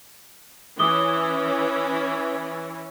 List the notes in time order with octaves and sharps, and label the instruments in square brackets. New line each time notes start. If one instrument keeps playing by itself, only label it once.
[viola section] E3 C#4 [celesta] D6 D#6 G7